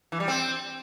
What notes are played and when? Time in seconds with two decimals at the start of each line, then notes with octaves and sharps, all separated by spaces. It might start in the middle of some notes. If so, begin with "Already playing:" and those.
0.12 E3
0.20 G3
0.28 C4